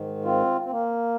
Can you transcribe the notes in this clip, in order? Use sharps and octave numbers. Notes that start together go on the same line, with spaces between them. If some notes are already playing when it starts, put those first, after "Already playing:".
Already playing: G#2 D#3
C4 F4
C4
A#3